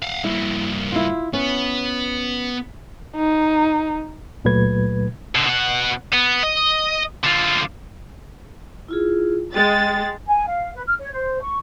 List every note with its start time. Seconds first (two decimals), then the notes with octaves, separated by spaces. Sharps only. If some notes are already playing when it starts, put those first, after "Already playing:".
0.03 F5 F#5
0.24 G2 A#3 E4
0.92 E4 F4
1.33 B3 C#4
3.16 D#4
4.44 C#2 A#2 F#3 A3 B4 G#6
5.35 B2 D3
5.46 B2 F#5
6.13 B3
6.44 D#5
7.24 D3 F4
8.88 E4 F4 G#4
9.54 G#3 G5 A6
10.27 G#5
10.46 F5
10.74 B4
10.87 F6
10.99 C#5
11.12 C5
11.41 C#6